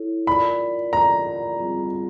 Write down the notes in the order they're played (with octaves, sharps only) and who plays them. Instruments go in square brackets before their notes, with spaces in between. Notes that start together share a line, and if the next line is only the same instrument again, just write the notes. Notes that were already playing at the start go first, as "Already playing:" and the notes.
Already playing: [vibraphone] E4 A4 C#5
[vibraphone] F4 A#4 D5 [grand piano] B5
[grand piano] A#5
[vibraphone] G3 C4 F4 G#4